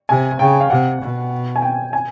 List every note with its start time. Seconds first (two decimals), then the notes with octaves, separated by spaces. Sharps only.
0.09 C3 G#5
0.39 C#3 G5
0.61 F5
0.70 C3 F#5
1.01 B2
1.56 G#5
1.62 G5
1.93 G#5